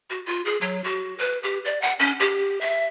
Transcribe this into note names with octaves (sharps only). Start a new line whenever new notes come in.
F#4
F4
G#4
F#3
F#4
B4
G4
D5
F#5
C#4
G4
E5